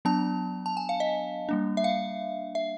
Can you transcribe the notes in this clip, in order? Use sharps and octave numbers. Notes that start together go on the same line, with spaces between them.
F#3 B3 D4 A5
A5
G#5
F5
D#5
G3 A#3 D4
E5
F5
E5